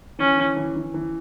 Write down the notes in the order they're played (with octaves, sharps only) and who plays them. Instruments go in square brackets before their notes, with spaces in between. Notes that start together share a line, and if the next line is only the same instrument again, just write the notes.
[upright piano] E3 [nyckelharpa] C#4
[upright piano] E3
E3
E3
E3